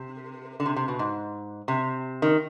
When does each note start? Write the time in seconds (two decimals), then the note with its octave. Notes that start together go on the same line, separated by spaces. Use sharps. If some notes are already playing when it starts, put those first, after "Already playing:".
Already playing: C3
0.60 D3
0.66 C3
0.76 C3
0.88 B2
0.99 G#2
1.68 C3
2.22 D#3